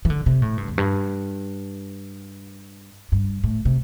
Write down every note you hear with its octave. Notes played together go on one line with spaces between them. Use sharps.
E3
D3
C3
A2
G2
E2
G2
G2
A2
C3